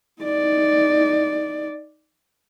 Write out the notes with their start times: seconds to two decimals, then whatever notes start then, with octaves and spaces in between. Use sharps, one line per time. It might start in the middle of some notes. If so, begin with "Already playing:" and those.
0.22 D#4 D5